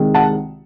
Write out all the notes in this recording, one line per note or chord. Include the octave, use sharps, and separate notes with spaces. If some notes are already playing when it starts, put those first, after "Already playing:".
Already playing: C2 C3 D#3 G#3
F#5 A5